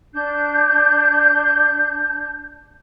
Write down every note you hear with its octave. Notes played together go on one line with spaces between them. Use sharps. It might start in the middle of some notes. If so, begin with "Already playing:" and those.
D4 G6